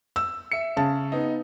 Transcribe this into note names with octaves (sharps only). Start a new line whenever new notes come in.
E6
E5 C#7
C#3 A5
B3 D#4